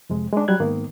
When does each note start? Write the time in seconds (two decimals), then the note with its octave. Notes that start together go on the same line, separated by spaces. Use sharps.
0.10 F2 C3 G#3
0.33 G#3 D4
0.48 F#3 G3 F#6 G#6
0.60 G#2 D#3 A#3 B3